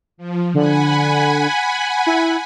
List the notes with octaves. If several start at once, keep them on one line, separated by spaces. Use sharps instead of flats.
F3
D3 F#5 G#5 B5
E4